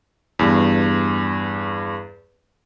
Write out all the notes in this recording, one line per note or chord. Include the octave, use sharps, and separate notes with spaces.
E2 G2